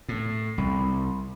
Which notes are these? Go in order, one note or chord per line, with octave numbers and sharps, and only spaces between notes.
A2
C2